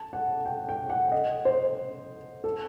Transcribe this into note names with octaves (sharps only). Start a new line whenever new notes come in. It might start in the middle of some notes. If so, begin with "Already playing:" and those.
Already playing: A5
F#5
G5
G5
F#5
D#5
C5
A4